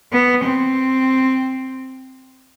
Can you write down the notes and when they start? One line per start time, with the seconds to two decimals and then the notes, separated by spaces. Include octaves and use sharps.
0.12 B3
0.44 C4